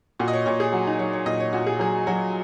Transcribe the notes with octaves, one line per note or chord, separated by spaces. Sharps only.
A#2 F#4
D#5
C#5
A#2 C#5
G#4
F#3 F#4
D#4
F#3 C#5
C#5
A#2 D#5
C#5
A#2 F#4
G#4
F#3 G#4
F#3 F#4